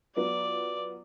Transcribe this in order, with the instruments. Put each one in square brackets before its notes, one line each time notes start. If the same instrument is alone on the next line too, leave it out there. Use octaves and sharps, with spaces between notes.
[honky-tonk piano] F#3 B3 F4 [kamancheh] D5